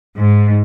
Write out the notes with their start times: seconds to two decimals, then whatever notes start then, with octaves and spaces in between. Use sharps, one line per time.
0.17 G#2